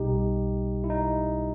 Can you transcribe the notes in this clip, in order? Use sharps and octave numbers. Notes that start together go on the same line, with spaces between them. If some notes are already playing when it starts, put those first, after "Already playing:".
Already playing: B1 B2 G3 D#4 G4
E4
D#4